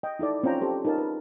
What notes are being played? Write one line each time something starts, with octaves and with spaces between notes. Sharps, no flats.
D#5 G5
D#4 E4 A4 D5
C4 C#4 F4 G5 A#5
G4 A4 C5
D#4 F4 A#4 C#5 A5
B4